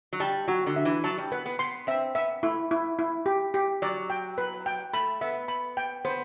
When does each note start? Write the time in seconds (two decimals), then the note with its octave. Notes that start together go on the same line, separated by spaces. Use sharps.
0.13 F#3
0.20 G3 A5
0.48 F#3 F#4
0.66 D3
0.76 E5
0.85 E3
1.04 F#3 A5
1.18 G3
1.32 B3 B4
1.46 B3
1.59 B3 C6
1.87 C4 E5
2.15 B3 E5
2.43 A3 E4
2.71 E4
2.99 E4
3.26 G4
3.54 G4
3.82 F#3 D5
4.10 G5
4.38 B4
4.66 G5
4.93 A3 B5
5.21 B3 E5
5.48 B5
5.77 G5
6.05 B3 C5